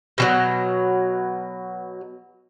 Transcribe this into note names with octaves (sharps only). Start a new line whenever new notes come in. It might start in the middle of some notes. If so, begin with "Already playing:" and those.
B2 E3 F#3